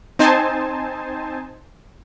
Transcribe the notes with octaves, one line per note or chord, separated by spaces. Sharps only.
C4 D#4 C5 G#5 A5